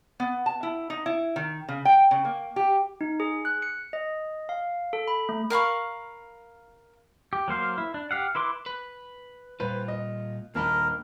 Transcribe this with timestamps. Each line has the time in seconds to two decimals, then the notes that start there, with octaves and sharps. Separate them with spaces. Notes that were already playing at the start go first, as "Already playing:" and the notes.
0.20 B3
0.46 A5
0.63 E4
0.90 D#4
1.06 E4
1.36 D#3
1.68 C#3
1.85 G5
2.11 C#3
2.25 A#3
2.56 G4
3.01 D#4
3.20 G#4
3.45 F#6
3.62 C#7
3.93 D#5
4.49 F5
4.93 A4
5.08 B5
5.29 A3
5.50 A#4 F5 B5 C#6
7.33 G4
7.48 F#3 A#3 C5 F5
7.78 E4
7.94 D4
8.11 G4 F5 F#5
8.35 E4 B4 C6 D6
8.66 B4
9.60 A#2 G3 F4 B4 C5
9.88 D#5
10.55 D#1 A#3 D4 A#4 D#5 A5 B5